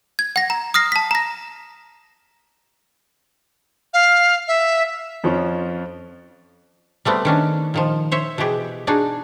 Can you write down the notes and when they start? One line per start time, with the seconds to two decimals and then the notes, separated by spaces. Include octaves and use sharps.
0.19 G#6
0.36 F#5 A#6
0.50 A#5
0.74 D#6 F6 A#6 C7
0.92 A5 B6
1.11 A#5 A#6
3.94 F5
4.48 E5
5.24 F2 F3 C#4
7.05 G3 A3 B3 C4
7.25 D#3 C#4 D4
7.74 A#2 D#3 F3
8.11 C5 C#5 E5
8.38 B2 E3 B3 G4 G#4
8.87 D4 D#4 F#4 G#4